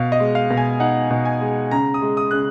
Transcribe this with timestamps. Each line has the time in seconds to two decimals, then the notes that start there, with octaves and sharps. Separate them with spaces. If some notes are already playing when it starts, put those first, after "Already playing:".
Already playing: B2 F5
0.12 D#5
0.20 G#3
0.35 F5
0.50 B2
0.57 G#5
0.80 D#4 F#5
1.10 B2
1.25 G#5
1.41 G#3
1.71 C#3 A#5
1.94 D#6
2.02 G#3
2.17 D#6
2.31 C#3 F#6